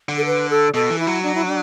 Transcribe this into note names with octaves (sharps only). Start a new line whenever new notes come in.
D3
A4
B4
A4
B2 A4
E3
E4
F#3
D4
E4
D4